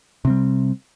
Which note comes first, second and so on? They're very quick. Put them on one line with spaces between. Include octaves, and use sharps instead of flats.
C3 C4 G3